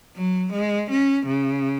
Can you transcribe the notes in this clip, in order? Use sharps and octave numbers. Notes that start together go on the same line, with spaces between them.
F#3
G#3
C#4
C#3